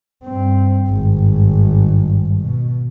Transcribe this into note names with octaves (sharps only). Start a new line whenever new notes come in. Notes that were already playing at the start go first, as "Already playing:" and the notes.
G2 C4
G#1 G2
B2